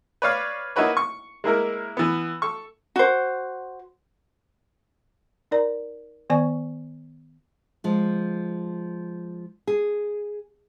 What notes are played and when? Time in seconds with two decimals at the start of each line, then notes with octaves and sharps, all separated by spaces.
0.22 B4 C#5 D5 F5
0.76 A#3 D#4 E4 F#4 B4 C#5
0.97 C#6
1.44 G#3 A#3 E4 A#4
1.97 E3 B3
2.42 A4 C#6
2.96 F#4 C5
5.51 D#4 A#4 D5 A#5
6.30 D#3 B3 D5 G#5 C#6
7.84 F3 G#3
9.67 G#4